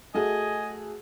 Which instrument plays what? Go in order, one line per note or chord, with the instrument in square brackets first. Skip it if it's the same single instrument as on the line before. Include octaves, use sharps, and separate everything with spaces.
[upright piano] A3 F#4 G#4 [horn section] D#5 G#5